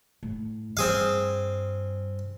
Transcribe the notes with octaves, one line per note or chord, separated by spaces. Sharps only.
A2
G2 C4 G#4 F5